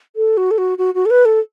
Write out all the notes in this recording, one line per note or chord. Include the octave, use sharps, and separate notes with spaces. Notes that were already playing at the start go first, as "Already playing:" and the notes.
A4
F#4
A4
F#4
F#4
F#4
A4
B4
A4